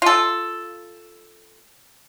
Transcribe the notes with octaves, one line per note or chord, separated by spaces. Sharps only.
F4 A4